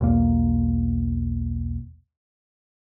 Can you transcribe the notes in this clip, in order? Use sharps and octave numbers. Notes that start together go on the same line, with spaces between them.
B1 E2 A#3